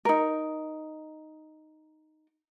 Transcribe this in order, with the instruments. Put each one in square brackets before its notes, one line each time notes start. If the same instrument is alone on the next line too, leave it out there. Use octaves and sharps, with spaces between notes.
[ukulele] D#4 A#4